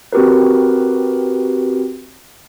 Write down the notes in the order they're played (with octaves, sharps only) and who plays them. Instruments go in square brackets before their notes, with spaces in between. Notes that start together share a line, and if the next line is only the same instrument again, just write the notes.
[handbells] C4 F#4 G4 A#4 B4